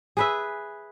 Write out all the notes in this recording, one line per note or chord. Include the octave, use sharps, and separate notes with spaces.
G#4 B4 E5